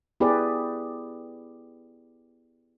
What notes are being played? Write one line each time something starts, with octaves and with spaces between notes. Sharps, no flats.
B3 E4 G4 G#4 B4 D5